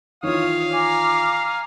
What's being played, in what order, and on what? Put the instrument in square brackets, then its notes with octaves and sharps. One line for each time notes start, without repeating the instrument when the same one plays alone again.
[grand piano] D#3 E3 F4 [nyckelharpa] C#5 D#6 [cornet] F5
[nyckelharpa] G#5 A#5 [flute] D6